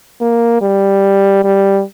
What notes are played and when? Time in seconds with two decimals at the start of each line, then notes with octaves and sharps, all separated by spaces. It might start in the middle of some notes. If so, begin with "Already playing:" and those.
0.21 A#3
0.61 G3
1.44 G3